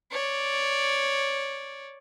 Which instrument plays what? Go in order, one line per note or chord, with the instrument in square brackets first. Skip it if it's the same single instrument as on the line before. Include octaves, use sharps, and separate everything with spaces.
[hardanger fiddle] C#5 D5